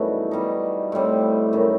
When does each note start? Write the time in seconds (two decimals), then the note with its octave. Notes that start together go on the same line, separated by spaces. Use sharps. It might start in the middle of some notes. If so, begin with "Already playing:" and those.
Already playing: F#2 B2 E3 G3 A3 C4 D#4
0.31 B2 G3 D#4
0.92 A2 G3 C4
1.53 F#2 D#3 G3 D#4